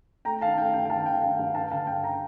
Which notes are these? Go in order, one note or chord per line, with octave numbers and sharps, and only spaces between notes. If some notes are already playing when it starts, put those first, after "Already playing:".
A3 G5 A#5
D#3 F5 A5
A3 G5
G2 G5
G5
D#3 F5 A5
D#3 G5
G2 F5
G2 G5
G2 F5 A5
D3 F5 A5
G2 G5
G5 A#5